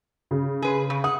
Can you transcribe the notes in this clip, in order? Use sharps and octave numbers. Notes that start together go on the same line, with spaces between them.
C#3
G#4 B4
C#3
F#5 D#6